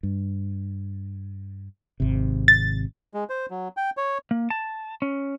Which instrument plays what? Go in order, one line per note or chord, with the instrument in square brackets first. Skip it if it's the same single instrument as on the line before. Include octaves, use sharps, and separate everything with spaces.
[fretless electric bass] G2
G#1 C3
[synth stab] A6
[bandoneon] G#3
C5
F#3
G5
C#5
[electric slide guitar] A#3
A5
C#4